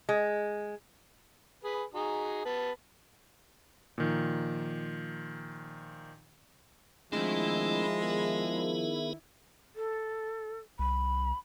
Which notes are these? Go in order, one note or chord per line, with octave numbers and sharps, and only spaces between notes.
G#3
G#4 B4
D#4 F#4 G#4
B3 B4 A5
A#2 D#3 F3
D#3 F3 G#3 A3 C4 D4 E4
B3 G#4 A#4
A4
C2 B5